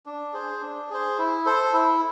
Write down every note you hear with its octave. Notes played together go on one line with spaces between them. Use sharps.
D4
G#4 C5
D4
G#4 C5
E4
A4 C5
E4